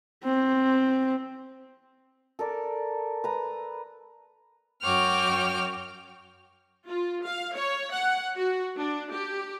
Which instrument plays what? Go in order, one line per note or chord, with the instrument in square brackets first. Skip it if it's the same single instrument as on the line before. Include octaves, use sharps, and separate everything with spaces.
[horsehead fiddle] C4
[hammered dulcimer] A4 A#4 D5
B4 A#5
[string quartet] F#2 F#4 C#5 G5 D6 F6
[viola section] F4
F5
C#5
F#5
F#4
D4
G4